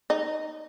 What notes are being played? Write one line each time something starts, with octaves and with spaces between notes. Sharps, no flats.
D#4